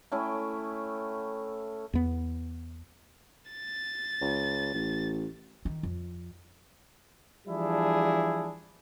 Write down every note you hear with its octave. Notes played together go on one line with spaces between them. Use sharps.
A3 C#4 E4 G5
E2 B3
A6
C#2
A1
D#3
F2
E3 F3 G3 D4 E4 G#4